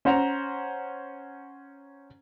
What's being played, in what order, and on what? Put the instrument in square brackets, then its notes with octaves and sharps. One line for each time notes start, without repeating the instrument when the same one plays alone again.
[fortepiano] C#4 C5 F#5 A#5